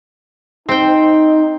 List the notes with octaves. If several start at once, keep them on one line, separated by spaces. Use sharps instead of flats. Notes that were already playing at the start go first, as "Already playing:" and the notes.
C4 D#4 G5